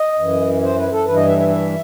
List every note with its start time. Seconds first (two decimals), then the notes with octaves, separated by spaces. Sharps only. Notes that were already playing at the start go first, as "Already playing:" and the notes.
Already playing: D#5
0.19 F#2 E3
0.63 C5
0.77 B4
0.92 A4
1.06 G2 E3 B4
1.16 D#5
1.27 E5
1.38 E5
1.49 E5